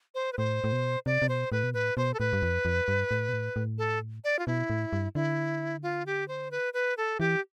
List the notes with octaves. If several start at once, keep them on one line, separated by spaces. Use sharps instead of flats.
C5
B4
A2 C5
A2
B2
C3 D5
C3
B2 C5
A2 B4
B2
A2 B4
B2 C5
A4
A2 B4
G2
F2
F2
G2
A2
B2
A2
A2
A4
D5
F4
B2 E4
A2
G2
D3 E4
F4
G4
C5
B4
B4
A4
E3 G4